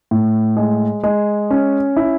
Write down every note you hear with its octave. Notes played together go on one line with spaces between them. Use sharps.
A2
G#3
G#3
C#4
E4